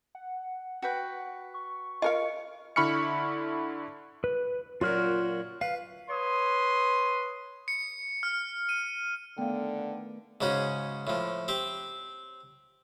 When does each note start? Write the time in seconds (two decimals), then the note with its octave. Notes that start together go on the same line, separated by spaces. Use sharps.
0.15 F#5
0.82 F#4 B4 G5
1.54 C#6
2.02 F4 A#4 D#5 F5 C#7
2.76 D3 E4 B5 C#6 F6 C#7
4.24 B4
4.81 F#2 A#2 F4 F#4 F6
5.61 B4 F5
6.09 B4 C#5 C6 D#6
7.68 C#7
8.23 F6
8.69 D#7
9.38 D3 D#3 A3 B3 F5 G5
9.78 B4
10.41 G#2 C#3 C#4 F#4
11.07 A2 F3
11.48 C4 G4